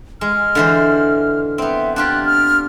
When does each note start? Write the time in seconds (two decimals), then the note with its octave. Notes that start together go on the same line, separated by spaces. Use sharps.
0.21 G#3 F6
0.55 D3 E3 C5
1.58 B3 C4 E5
1.96 D4 F4 G4 F#6
2.25 F6